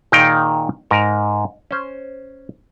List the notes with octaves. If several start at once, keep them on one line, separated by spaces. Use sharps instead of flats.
A#2 D#3 D#4 G#4 A#4 G5
G#2 A#4
C#4 C5